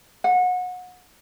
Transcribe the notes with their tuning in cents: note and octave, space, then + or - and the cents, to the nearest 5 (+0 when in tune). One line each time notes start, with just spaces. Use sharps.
F#5 -30